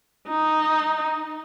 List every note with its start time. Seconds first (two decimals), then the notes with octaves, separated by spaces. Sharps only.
0.28 D#4